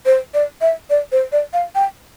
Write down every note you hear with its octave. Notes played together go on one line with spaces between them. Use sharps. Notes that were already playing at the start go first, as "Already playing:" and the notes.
C5
D5
E5
D5
C5
D5
F5
G5